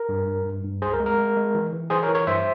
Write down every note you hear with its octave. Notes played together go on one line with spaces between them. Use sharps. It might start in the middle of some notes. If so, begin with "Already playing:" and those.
Already playing: A#4
G2
G2
G2
G2
C#2 G#4 C5
A#4
G#3
A#4
G#3
G#3
E3
E3
E3 G#4 C5
A#4 C#5
E3
A#4 C#5
G2 C5 E5